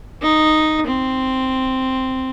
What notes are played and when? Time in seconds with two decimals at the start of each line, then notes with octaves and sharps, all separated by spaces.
0.22 D#4
0.86 C4